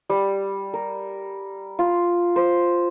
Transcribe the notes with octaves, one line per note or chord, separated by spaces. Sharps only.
G3
A#4
F4
C5